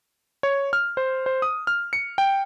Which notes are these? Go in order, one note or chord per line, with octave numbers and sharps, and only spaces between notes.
C#5
F6
C5
C5
D#6
F6
C#7
G5